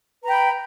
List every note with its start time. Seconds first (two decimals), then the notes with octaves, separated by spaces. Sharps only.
0.22 B4
0.25 A#5
0.28 G5
0.30 B5